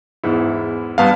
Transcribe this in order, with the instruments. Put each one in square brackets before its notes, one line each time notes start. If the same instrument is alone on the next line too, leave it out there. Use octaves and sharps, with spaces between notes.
[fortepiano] E2 G#2 E4
[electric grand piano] G2 B3 F5 [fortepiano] F#5 A5